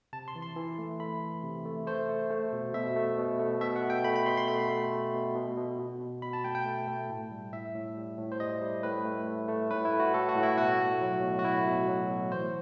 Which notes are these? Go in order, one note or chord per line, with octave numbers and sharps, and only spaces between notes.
C3 A5
C6
E3
C6
E3
A3
A3 B5
E3
C3
A3
A3 C5
A3
A3
B2
B2 E5
A3
B2
A3
B2 E5
F#5
B2
G5
A3 B5
B5
B2 C6
C6
A3 B5
A3
A3
B2
B2
B2
B2
B2
B2 B5
A5
A3 G5
G5
A3
A3
A2
G3
A2 E5
A2
G3
A2
C5
G3 D#5
G3
A2 B4
A3
A3
A3
A2 B4
E4
A3
F#4
A2 A4
F#4
A2
E4
B2 F#4
A3
F#3
B2
F#4
A3 E4
B2
F#3
B2
E3 C5